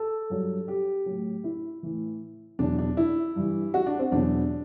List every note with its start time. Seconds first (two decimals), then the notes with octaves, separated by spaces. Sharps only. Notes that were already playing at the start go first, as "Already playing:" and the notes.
Already playing: A4
0.30 G2 F#3
0.68 G4
1.06 A2 F#3
1.44 E4
1.83 A2 E3
2.59 E2 B2 F#3 D4
2.78 D4
2.97 E4
3.36 G2 E3
3.74 F#4
3.86 D4
3.99 C4
4.12 E2 B2 F#3 D4